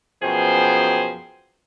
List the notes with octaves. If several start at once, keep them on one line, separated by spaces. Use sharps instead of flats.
F#2 B2 F3 G#4 C5 G5